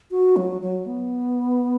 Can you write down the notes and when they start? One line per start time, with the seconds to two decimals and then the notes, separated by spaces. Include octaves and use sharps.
0.11 F#4
0.36 F#3
0.61 F#3
0.86 B3